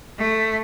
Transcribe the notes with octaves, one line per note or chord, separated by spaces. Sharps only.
A3